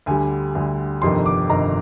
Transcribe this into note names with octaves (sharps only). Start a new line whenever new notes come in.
D2 D3 G3 G#5
D2 D3 G3
G1 F2 C3 D#3 C6
D6
G1 F2 C3 D#3 A#5